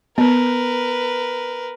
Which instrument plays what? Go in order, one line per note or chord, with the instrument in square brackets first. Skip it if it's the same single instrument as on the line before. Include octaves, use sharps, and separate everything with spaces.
[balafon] B3 [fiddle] A#4 B4